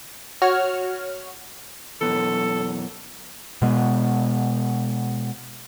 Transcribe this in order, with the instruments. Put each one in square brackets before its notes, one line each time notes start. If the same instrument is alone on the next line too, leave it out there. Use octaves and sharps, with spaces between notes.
[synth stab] F#4 C#5 F6
[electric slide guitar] F#2 B2 E3 [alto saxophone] A4
[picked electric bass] B2 G#3 B3